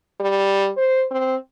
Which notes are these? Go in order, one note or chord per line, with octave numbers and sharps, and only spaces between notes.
G3
C5
C4